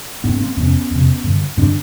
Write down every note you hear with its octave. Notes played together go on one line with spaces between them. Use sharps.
G#2 B3 C#4
C#4
A#3 C4
F2 C3 B3 C#4
F2 C3
G2 D3
G2 D3 C4 D4